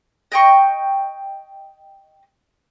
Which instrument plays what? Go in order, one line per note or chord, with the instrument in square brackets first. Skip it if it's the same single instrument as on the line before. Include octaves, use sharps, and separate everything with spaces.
[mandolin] D#5 G5 C#6